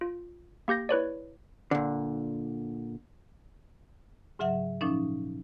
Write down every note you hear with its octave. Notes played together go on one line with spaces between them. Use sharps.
F4
A#3 G4 G6 A#6
E4 B4 C#5 D5
A#2 D3
G#2 C#3 F#3 E5 F#5
A#2 F3 C#4 D#4